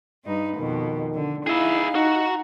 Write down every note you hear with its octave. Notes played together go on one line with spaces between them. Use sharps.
G2 D#4 B4
F2 B2 D#3
D3
D#4 E4 G#4 E5 F5 B5
D#4 F#4 A#5